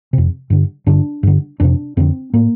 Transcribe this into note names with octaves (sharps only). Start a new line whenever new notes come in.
F2 C3
G2 D3
G2 D3 D4
G2 D3
F2 C3 D4
F2 D3 C4
A2 A#3